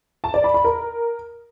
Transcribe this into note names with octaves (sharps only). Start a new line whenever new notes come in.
A5
D5
B5
B5
A#4